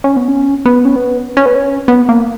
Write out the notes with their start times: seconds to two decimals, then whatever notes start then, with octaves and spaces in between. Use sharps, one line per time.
0.04 C#4
0.17 B3
0.28 C#4
0.66 B3
0.85 C#4
0.96 B3
1.37 C#4
1.46 B3
1.55 C#4
1.88 B3
2.09 A#3